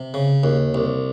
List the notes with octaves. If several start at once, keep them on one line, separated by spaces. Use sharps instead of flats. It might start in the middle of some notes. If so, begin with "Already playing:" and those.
Already playing: C3
C#3
D#2
C2